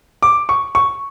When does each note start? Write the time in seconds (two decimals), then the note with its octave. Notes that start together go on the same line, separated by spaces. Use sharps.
0.22 D6
0.49 C#6
0.75 C#6